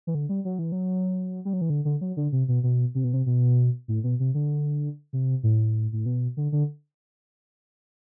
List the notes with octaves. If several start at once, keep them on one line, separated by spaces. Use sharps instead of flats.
E3
D3
G3
F#3
E3
F#3
G3
F#3
E3
D3
D3
F#3
D3
C3
B2
B2
C3
B2
C3
B2
A2
B2
C3
D3
C3
A2
A2
B2
D3
D3